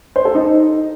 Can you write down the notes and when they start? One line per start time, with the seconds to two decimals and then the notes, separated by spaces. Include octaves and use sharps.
0.16 C5
0.25 A4
0.35 D#4